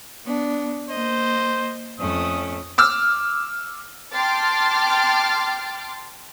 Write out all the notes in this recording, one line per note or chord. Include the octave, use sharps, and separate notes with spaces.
B3 D4
A#3 C5 D#5
F2 A3 C#4 D#6
D6 E6 F6
G5 A5 C6 D6 F6 A6